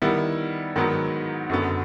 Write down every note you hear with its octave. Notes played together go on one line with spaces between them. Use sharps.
D#3 G3 B3 E4
G#2 D#3 F#3 B3
F#2 D3 F#3 B3